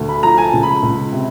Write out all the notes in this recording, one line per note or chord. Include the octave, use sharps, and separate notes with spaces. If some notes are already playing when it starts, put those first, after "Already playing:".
Already playing: D2
B5
F3 A#5
G#5
A5
C#2
B5
C#2
C3